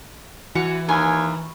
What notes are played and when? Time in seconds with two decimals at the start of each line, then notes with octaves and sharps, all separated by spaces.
0.55 E3 F#4 F#5 A#5
0.89 D#2 G#5 B5 C#6